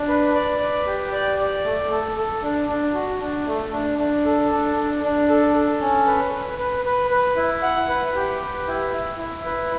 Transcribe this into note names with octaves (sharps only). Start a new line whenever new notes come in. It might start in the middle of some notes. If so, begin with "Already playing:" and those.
Already playing: D4
B4
D5
B4
G4
D5
D5
A3
A4
A4
D4
D4
F#4
D4
A3
D4
D4
A4
D4
D4
D4
A4
A4
C#4
B4
B4
B4
B4
B4
E4
F#5
B4
G4
B4
E4
E4
E4
B4